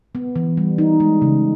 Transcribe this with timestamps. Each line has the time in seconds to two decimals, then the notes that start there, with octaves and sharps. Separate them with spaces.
0.15 B3
0.36 E3
0.57 G3
0.78 D#4
1.00 G#3
1.22 C#3